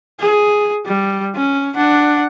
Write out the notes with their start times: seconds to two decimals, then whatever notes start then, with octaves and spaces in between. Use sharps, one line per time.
0.20 G#4
0.86 G3
1.35 C#4
1.76 D4 F#5